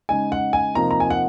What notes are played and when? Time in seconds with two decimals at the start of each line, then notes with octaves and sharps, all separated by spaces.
0.09 C#3 G#3 D#4 G#5
0.32 F#5
0.53 G#5
0.75 C3 F3 A#3 D#4 A#5
0.91 A#5
1.00 G#5
1.10 F#5